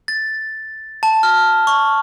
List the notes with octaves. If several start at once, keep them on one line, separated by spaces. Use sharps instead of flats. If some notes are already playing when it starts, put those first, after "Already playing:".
A6
A5
F6
C#6